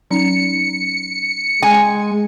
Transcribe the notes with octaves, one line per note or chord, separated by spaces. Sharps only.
F#3 C#4 D#4 C#7
G#3 G#5